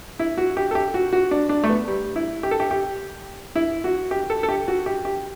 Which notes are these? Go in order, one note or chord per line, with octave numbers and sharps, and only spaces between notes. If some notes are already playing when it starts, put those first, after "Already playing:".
E4
F#4
G4
A4
G4
F#4
F#4
D4
D4
A3
B3
G3
E4
G4
A4
G4
G4
E4
F#4
G4
A4
A4
G4
F#4
G4
G4